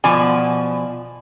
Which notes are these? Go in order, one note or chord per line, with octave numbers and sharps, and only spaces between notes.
B2 F3 D5 G#5